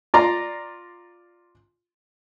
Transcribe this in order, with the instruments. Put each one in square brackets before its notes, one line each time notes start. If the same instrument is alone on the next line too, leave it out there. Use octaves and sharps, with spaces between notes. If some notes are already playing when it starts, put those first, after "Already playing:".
[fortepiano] F4 D5 A#5 C6